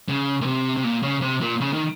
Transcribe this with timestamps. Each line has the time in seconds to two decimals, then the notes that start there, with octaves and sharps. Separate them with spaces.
0.08 C#3
0.41 A#2
0.46 C3
0.77 C3
0.84 A#2
1.03 C#3
1.22 C3
1.41 A#2
1.61 C#3
1.73 D#3